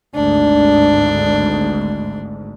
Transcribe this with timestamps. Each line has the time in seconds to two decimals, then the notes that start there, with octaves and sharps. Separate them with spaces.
0.15 G#1 D2 G#2 D4